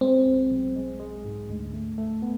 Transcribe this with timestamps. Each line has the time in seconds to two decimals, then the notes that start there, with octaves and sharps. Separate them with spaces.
0.01 G#3 C4
0.26 B1
0.51 B1
0.76 G#3
0.99 G#3
1.25 G#2
1.49 D2
1.74 A3
1.98 A3
2.22 B3